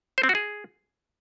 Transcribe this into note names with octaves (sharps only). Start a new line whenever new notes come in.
C5
C4
F#4
G#4